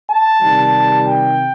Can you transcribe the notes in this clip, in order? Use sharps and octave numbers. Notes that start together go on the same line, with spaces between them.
A5
C3 D#3 G3
G5